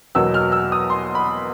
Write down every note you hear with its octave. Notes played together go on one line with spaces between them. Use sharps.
E2 B2 F#3 A#3 E6
F6
E6
D#6
C6
B5